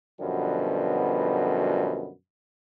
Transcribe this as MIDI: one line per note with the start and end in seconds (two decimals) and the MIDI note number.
0.21 2.09 42
0.21 2.09 47
0.21 2.09 50
0.21 2.09 53
0.21 2.09 55
0.21 2.09 59